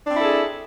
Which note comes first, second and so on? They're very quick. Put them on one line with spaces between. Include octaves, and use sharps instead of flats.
D4 C4 E4 A4 G#4